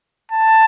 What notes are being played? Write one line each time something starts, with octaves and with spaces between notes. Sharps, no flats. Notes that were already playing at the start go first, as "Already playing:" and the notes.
A5